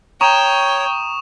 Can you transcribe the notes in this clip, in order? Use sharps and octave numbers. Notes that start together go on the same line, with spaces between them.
C#5 G5 A#5 C#6 D#6 E7